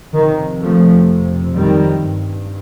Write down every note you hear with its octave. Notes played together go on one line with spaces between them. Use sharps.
F2 C3 D#3
F3 A3
D#3 G3
G2